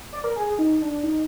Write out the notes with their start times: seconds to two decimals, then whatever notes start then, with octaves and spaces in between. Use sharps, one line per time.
0.13 D5
0.24 A#4
0.36 G#4
0.46 G#4
0.59 D#4
0.82 D4
1.03 D#4